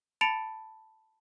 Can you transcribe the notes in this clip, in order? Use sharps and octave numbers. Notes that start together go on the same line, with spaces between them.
A5 B5 A6 C#7 D7 F7